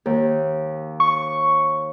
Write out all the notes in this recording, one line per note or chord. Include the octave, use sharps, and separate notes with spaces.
D#2
C#6